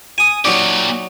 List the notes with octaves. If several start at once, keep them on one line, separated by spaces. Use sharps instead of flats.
G#5 D#6
A#2 F#3 D#4 G4 D5